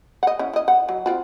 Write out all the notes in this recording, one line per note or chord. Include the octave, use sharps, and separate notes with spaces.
D#5 F#5
C#4 E4
E4 D#5
F#5
F#3
C4 F4 F#4